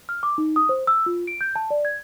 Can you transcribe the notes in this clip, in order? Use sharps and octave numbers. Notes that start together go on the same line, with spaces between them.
F6
D6
D#4
D#6
C5
E6
F4
D7
G6
A5
D5
G#6